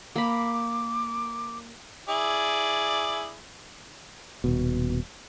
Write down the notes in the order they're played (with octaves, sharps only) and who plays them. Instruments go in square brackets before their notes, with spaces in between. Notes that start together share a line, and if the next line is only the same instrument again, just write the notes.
[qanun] A#3 B5 [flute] D6
[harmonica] E4 G#4 D5
[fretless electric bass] D#1 B2